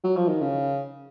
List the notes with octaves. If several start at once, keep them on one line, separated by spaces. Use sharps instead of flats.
F#3
F3
D#3
C#3